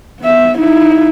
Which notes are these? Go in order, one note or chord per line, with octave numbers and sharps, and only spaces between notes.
B3 E5
D#4 E4